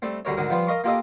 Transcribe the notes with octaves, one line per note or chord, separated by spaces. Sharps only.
G3 A3 C4
D2 D3 G3 A#4 C#5
D2 G#2 D3 A#4
F3 G3 B3 F4 C5
A#4 D#5 F5 A#5 C6 C#6
A#3 F4 G4 A4 D#5 F5